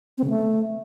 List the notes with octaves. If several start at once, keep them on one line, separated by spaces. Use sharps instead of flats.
C4
C#3
A3